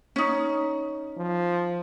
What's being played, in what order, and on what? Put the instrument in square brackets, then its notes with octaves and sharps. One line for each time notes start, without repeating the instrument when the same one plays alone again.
[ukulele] C#4 D#4
[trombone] F3